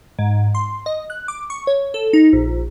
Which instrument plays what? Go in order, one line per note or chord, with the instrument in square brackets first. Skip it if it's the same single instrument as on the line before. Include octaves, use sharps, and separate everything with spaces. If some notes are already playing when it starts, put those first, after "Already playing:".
[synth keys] G#2
C6
D#5
F#6
D6
C#6
C#5
A4
D#4
A#1